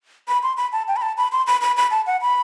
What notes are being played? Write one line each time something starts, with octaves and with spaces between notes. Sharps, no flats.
B5
C6
B5
A5
G5
B5
A5
B5
C6
B5
B5
B5
A5
F#5
B5